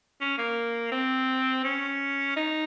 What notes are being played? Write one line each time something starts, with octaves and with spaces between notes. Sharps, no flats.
C#4
A#3
C4
C#4
D#4